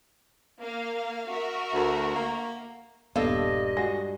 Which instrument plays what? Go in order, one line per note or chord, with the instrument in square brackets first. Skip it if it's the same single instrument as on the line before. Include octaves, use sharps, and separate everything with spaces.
[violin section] A#3 F5
F#4 A#4 E5
[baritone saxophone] D2
A#3
[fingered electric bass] D#1 A#3 B3 [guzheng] G2 [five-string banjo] A4 F5 [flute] D#5
[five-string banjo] G#3 F#4